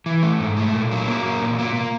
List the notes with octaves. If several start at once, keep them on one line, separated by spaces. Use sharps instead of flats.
E3
A3
G#2
A3
A#2
F#3
A#3
F#3
A#2
A#3
A#3